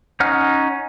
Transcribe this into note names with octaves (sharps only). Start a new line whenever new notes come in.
C#4 D#4 F#5 F6